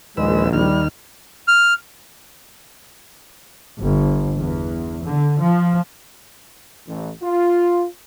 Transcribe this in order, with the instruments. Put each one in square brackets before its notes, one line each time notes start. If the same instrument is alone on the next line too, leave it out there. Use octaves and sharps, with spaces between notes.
[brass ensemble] A#1 [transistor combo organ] D#2 B4 E6 [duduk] G#3
[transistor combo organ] D#2 D#3 F6 [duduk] G3
[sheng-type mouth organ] F6
[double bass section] G1
E2
D3
F3
[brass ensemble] A1
F4